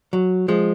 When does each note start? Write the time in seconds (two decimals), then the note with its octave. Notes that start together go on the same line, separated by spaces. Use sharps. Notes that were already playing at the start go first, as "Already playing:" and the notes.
0.13 F#3
0.48 F3 G#3